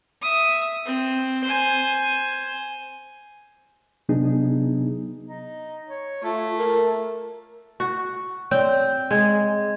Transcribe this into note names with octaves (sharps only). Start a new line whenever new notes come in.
E5 D#6
C4
C5 G#5
C3 F#3 B3 D4 D#4 G#4
D#4
C#5
A3 F4
A#4
F#4
C4 C#5 D5 G5 G6
G#3 G#6